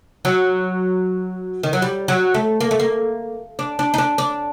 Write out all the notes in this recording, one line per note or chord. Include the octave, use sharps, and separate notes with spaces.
F#3
D#3
F#3
G3
F#3
A3
A#3
A3
A#3
D4
D4
D#4
D4
D4